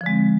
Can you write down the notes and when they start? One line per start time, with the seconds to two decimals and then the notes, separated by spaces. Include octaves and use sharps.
0.01 F3
0.04 D3
0.06 G#3
0.09 C4